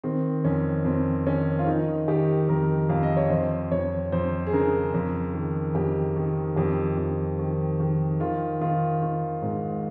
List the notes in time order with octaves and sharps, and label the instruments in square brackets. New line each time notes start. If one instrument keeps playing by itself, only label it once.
[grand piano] D#3 C4
F2 C#4
F2 C4
D#3 C#4
F4
D#3 D#4
D#3 G4
F2 A#4
F2 F5
D#5
C#5
F2 C5
F2 C#5
F2 C5
G#4
C#3 A#4
F2
D#3
F2 G4
D#3
F2 G4
F2
D#3
D#3
D#3 F4
D#3 F4
D#3
G#2